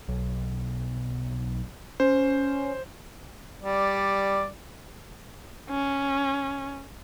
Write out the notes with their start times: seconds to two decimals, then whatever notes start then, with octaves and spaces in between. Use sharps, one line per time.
0.08 B1
2.00 C#4 C5
3.63 G3 D5
5.70 C#4